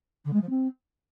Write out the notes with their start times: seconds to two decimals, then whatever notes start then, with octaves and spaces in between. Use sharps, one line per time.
0.25 D3
0.33 G#3
0.41 F3
0.49 C4